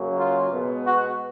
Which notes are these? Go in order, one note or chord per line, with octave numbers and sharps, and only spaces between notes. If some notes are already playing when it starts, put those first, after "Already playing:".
Already playing: F#2 C#3 F#3 A#3
F4
B2 G#3 B3
F#4